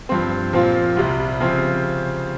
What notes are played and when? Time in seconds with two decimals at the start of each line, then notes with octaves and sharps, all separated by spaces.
0.09 G2 F3 C4
0.53 A#2 F3 C4 F4
0.97 C2 C3 G3
1.40 C#3 F3 C4